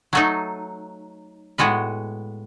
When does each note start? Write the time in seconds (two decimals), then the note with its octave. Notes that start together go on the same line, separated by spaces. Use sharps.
0.13 F#3 A3 D#4 F#4
1.58 A2 G#3 B3 F#4 B4